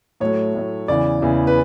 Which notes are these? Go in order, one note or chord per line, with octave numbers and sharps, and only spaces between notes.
A2 F#3 A3 C#5
A2 F#3 A3
E2 C#3 E3 D5
E2 C#3 E3
B4